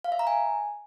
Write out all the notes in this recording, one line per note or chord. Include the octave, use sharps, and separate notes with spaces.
F5
E5
A#5
G#5